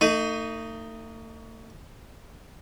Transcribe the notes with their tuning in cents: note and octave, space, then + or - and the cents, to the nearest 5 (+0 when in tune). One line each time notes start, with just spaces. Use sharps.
A3 +40 D#4 +0